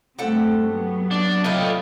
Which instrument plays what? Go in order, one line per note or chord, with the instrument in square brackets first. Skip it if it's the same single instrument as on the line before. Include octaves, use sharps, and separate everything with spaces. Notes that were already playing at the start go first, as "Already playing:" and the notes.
[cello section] G2 A3 C4 [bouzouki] G4 A4 F#5
[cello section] F#3 B3
[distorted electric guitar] D4
[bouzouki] A2 G3 G5 [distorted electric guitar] F4 D#5